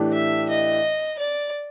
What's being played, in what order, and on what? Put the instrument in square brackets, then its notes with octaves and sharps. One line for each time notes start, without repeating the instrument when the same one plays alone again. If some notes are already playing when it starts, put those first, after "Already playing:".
Already playing: [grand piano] A2 E3 A3 D4 G4
[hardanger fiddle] E5
D#5
D5